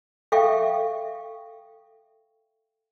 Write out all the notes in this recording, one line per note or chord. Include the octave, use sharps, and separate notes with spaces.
A4 E5 F5 G5 C#6